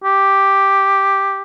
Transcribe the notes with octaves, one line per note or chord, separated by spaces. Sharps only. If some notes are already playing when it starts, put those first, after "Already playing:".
G4